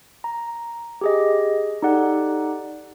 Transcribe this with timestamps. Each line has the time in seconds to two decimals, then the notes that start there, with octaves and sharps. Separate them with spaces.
0.24 A#5
1.01 G4 G#4 D#5
1.82 D#4 G4 A4 D5 F#5